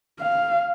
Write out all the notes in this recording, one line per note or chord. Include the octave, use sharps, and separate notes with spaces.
F5